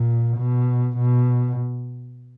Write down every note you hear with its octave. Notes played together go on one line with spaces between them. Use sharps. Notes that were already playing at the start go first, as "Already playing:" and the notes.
Already playing: A#2
B2
B2